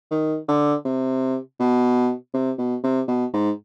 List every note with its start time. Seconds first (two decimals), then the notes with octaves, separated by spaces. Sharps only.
0.11 D#3
0.48 D3
0.85 C3
1.60 B2
2.34 C3
2.58 B2
2.84 C3
3.08 B2
3.34 G#2